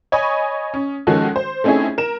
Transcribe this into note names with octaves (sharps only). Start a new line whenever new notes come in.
C#5 D#5 G#5 B5 C#6 D#6
C#4
D#3 F3 G#3 C#4 F#4 A4
C5
A3 C4 C#4 D#4 E4 G#4
A#4 E7